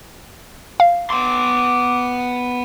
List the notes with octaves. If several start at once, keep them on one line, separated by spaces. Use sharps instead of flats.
F5
B3 C6 D6